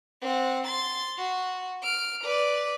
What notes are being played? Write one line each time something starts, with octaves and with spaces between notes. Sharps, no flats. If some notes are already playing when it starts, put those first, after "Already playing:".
C4 F#5
C6 A6
F#4
F6 D7
B4 D5